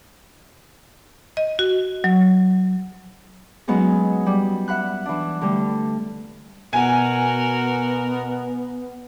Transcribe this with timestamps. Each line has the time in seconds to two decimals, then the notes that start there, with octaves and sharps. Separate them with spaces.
1.37 D#5
1.59 F#4
2.04 F#3
3.68 F#3 G#3 B3 C#4 D#4 G#4
4.26 G3
4.68 E5 F#5 B5 F#6
5.06 E3 D4
5.41 D3 G3 A3
6.73 B2 B3 F#4 A#4 F#5 G#5